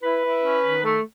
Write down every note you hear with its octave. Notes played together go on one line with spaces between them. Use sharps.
E4 B4
E4
C#4
D#3
A3